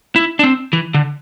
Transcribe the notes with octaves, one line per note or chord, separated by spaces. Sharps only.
E4
D4
C4
E3
D3